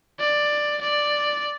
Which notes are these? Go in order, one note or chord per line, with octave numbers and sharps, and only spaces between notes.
D5
D5